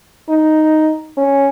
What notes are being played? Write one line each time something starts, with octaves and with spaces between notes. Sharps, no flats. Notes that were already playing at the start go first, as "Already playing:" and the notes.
D#4
C#4